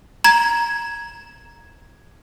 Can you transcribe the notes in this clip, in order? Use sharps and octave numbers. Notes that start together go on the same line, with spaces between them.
A#5 G#6